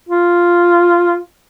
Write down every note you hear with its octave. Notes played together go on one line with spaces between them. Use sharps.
F4